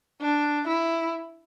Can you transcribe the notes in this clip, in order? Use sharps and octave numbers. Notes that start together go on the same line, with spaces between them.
D4
E4